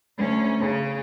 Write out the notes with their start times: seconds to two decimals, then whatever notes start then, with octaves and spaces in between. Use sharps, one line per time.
0.18 D2 C#4
0.60 C#3 C#4